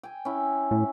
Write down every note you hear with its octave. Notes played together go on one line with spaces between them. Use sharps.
G5 G#5
C#4 E4
A2